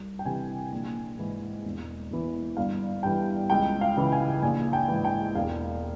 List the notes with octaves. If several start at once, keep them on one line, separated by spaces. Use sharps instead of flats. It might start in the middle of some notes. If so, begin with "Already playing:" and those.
Already playing: C2
G5
C3 E3 G#5
A#1
G#2 E3
E1
E2 E3
G1 F5
G2 E3 G5
C#2 G5
F5
C#3 E3
G#5
A#1 G#5
G5
G#2 E3
G5
E1 F5